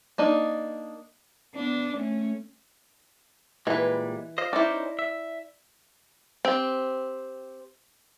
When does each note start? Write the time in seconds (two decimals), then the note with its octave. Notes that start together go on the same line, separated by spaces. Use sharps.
0.18 A#3 D4 D#4
1.55 B3 D4
1.97 A3 C#4
3.67 A#2 E3 G3 G#3 B4
4.38 F4 C5 D#5
4.53 C#4 D#4 E4 C5 D5
4.99 E5
6.45 C4 G4